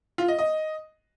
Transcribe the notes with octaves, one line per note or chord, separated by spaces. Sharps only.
F4
D#5
D#5